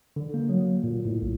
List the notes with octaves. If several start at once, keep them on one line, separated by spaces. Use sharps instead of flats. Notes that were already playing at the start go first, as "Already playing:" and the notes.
D3
A#3
F#3
A#2
A2
B1